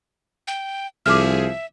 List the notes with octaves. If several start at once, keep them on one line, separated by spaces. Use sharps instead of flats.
G5
C2 F3 G#4 E5 D6 F6